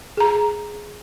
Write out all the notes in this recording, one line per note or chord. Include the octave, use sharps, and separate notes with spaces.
G#4 A#5